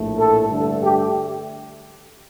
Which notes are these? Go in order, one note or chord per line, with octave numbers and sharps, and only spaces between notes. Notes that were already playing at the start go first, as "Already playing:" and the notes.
Already playing: A#1 A2 A3
A4
G2 D3 A3
G4